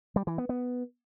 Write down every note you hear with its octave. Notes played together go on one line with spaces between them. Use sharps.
G3
E3
B3
B3